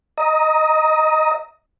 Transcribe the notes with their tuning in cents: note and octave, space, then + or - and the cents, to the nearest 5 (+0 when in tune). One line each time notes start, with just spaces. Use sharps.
D#5 +0 A#5 +0 D#6 +20